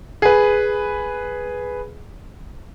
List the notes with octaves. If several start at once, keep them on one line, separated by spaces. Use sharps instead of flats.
G#4 B4